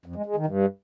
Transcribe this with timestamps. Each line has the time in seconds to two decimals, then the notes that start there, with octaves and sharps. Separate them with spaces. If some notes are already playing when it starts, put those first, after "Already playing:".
0.06 F2
0.16 G#3
0.26 G#3
0.36 D#3
0.46 G2